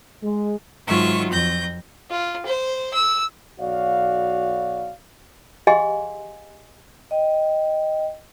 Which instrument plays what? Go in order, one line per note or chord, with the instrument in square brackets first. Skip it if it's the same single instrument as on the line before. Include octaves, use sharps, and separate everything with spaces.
[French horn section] G#3
[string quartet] G#2 D#3 F#3 F4 E5 C#6
F2 G6 A#6
[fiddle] F4
C5
E6
[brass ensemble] B1 F#4 C#5 D5 F5
[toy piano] G4 G#4 D#5 F5 G#5 C6
[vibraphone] D#5 G5